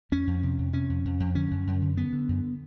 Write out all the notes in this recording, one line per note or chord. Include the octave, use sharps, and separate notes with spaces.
F2 C#4
F2
C3
F2
C3 C#4
F2
F2
F2
D3 C#4
F#2
F#2
D3
D3 B3
D3
F#2